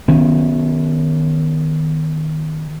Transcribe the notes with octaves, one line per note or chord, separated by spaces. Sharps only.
D#3 B3 C#4